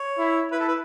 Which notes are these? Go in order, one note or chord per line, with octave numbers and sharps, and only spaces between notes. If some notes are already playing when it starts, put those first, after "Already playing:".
Already playing: C#5
E4
E4 B4
A4
B4